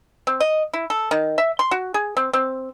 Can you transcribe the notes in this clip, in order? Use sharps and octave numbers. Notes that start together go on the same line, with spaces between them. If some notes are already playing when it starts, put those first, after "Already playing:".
C4
D#5
E4
A4
D#3
E5
C6
F#4
G#4
C4
C4